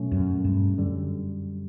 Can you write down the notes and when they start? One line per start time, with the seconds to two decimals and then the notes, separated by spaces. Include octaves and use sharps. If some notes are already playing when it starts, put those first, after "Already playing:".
Already playing: B2 F#3 A3 C#4
0.11 F#2
0.44 G2
0.78 F#2 D3 G3